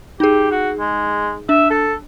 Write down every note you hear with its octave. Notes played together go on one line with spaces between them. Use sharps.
D#4 G4 G#4
F#4
G#3
D4 E5
A4